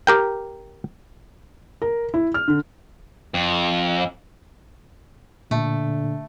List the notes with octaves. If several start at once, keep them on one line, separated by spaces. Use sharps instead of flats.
G4 A#4 G5
A#4
E4
F6
D3
F2
A#2 D3 A3